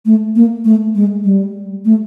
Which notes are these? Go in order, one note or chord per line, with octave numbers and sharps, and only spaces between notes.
A3
A#3
A3
G#3
G3
A3